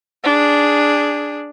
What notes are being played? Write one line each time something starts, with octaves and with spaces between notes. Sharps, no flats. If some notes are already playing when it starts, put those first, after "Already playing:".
D4 G#4